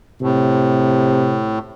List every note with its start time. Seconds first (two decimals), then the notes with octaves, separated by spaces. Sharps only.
0.22 A2 C3